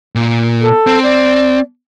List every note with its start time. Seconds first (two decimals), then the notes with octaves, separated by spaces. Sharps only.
0.15 A#2
0.62 A4
0.87 C4
1.03 D5